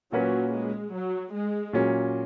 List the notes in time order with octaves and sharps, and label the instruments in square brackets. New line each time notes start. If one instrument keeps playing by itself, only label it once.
[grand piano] A#2 A#3 C#4 F#4 B4 [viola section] F#3
[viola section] G#3
F#3
G#3
[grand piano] A#2 F#3 C#4